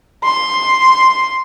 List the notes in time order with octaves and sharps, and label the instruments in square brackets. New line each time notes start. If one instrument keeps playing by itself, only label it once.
[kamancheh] C6